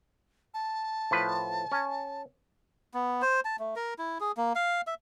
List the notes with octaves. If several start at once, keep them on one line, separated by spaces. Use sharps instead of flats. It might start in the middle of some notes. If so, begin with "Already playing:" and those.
A5
A2 F3 B4
C#4 G#5
B3
C5
A5
A3
A#4
E4
G#4
A#3
F5
E5